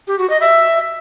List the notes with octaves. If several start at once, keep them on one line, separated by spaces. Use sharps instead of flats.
G4
F#4
D#5
E5